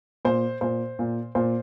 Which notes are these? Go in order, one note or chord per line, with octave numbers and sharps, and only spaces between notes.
A#2 C5
A#2 C5
A#2
A#2 C5